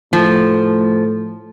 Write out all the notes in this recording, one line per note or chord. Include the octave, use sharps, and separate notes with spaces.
A2 F3